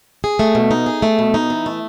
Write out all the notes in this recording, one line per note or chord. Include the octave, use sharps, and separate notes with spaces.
G#4
A3
B2
D#4
G#4
A3
B2
D#4
E3
A3